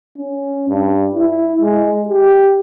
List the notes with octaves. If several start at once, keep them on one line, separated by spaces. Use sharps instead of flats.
C#4
G2
E4
G#3
G4